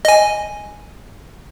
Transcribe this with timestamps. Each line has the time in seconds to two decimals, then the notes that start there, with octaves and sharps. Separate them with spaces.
0.05 D#5 G#5